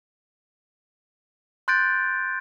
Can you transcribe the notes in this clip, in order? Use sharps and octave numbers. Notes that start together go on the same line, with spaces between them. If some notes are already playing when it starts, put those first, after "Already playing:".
C6 F#6 G6 A6 D7